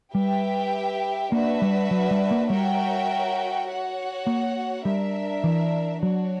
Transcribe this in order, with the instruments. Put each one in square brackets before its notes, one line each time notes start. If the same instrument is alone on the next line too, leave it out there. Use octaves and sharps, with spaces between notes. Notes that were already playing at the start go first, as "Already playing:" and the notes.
[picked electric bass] G3 [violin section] G4 B4 E5 G5
[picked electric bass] A#3 [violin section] D4 F#4 B4 E5
[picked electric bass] G3
F#3
G3
A#3
[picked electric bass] G3 [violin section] F#4 A#4 C#5 E5 G5
[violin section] F#4 C#5 F#5
[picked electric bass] A#3
[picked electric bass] G3 [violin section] D4 A#4 E5
[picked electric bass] E3
[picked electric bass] F#3 [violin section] D4 F#4 C#5